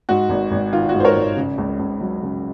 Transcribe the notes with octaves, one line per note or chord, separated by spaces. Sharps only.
G#2 F#4
G#1
G#1
D#3 F4
F#4
G#2
C5
A#4 C#5
G#1
C#3
C#2
C#2
F#3
C#3